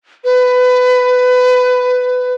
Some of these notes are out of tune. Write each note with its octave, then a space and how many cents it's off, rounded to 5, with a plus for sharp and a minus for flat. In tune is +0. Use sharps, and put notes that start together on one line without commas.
B4 +20